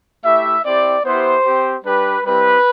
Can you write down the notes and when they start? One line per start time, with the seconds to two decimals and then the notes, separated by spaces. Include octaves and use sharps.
0.25 A3 E4 G4 E5
0.66 C4 E4 G4 D5
1.05 B3 E4 G4 C5
1.45 C4 G4
1.85 G3 D4 G4 B4
2.25 G3 C4 E4 G4 B4